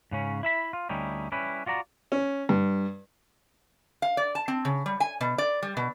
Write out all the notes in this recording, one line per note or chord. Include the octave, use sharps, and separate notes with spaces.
G#2 C#3 C#4
E4 E5 B5
F4
D2 G3 C#4 D#4 E4 G4
G3 C#4 E4 B4
F4 F#4 D5 A#5
C#4
G2
F5
D5
A5
C4
C#3
G3
G#5
B2
D5
G3
B2